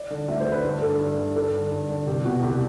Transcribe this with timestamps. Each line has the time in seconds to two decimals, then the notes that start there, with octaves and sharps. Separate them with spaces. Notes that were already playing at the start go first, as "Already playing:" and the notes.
Already playing: D5
0.10 D3
0.28 D2 E5
0.35 D5
0.40 C5
0.46 D3
0.52 B4
0.64 G2 G4
0.82 D3 A4
0.99 G2
1.18 D3
1.36 G2 A4
1.54 D3
1.71 G2
1.89 D3
2.06 C2 G4
2.25 B2 F#4
2.42 C2 G4